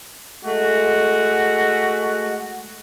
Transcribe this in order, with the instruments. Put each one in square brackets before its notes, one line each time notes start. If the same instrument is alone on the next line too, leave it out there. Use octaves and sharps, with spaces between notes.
[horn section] G#3 A3 F#4